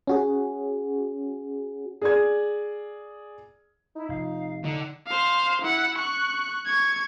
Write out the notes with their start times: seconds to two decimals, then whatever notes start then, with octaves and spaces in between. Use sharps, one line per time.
0.07 C#4 F#4 G#4
2.02 G#4 D5 G#6
3.95 D#4 E4
4.09 F1 F5
4.65 D3 D#4
5.07 C5 F5
5.62 E4 F#5
5.98 C#6 F#6
6.66 C#6 G#6